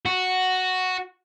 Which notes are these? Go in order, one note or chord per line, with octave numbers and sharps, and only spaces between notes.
F#4